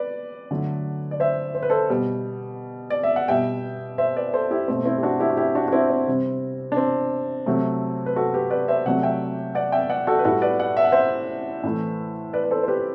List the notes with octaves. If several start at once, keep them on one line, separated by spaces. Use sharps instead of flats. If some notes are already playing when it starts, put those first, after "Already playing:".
Already playing: B4 D5
D3 F#3 A3
D5
C5 E5
C5
B4
A4 C5
B2 G3
D5
E5
F#5
B2 G3 E5 G5
C5 E5
B4 D5
A4 C5
E4 G4
B2 A3 C4
C4 E4
G4
D4 F#4
E4 G4
F#4
E4 G4
D4 F#4
F#4
C4 E4
C4
C3 G3
D4
C4
C3 F#3 A3
B4
F#4 A4
G4 B4
B4 D5
C5 E5
C3 F#3 A3 D5 F#5
E5 G5
D5 F#5
E5 G5
D5 F#5
F#4 A4
B4
A2 G3 F#4 A4
B4 D5
D5 F#5
E5
F#5
C5 E5
A2 E3 A3
B4 D5
B4
A4 C5
C5
G4 B4